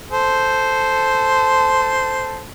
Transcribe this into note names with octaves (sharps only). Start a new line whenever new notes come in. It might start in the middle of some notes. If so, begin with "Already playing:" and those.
A4 C5